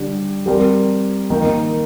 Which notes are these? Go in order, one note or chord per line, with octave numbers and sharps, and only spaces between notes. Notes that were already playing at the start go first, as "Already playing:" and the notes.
Already playing: D3 G3 D4 G4
G3 C4 G4 A#4
D#3 A#3 D#4